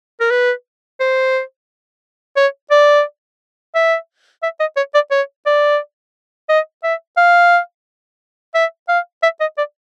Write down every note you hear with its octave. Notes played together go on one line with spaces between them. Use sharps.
A#4
B4
C5
C#5
D5
E5
E5
D#5
C#5
D5
C#5
D5
D#5
E5
F5
E5
F5
E5
D#5
D5